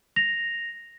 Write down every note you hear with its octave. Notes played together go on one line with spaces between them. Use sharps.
A#6 F7